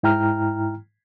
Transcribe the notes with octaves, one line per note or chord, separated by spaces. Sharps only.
G#2 E4 G5 A#5 F6